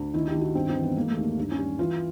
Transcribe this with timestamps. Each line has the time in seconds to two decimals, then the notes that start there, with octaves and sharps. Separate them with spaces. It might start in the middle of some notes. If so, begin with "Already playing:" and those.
Already playing: D2
0.14 D#3 E4
0.28 G4
0.35 D#3
0.41 F#4
0.55 G2 C4
0.69 C4
0.76 E3
0.83 B3
0.96 G#3 A#3
1.10 A3
1.17 D#2
1.23 A#3
1.38 G2
1.52 C#4
1.58 G3
1.79 E3 F4